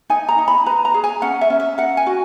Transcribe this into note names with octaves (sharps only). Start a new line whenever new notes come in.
D#4 G#5
A#5
D#4
B5
B4 A#5
A#5
G#4
G#5
C#4 F#5
E5
C#4
E5
A#4 F#5
G#5
F#4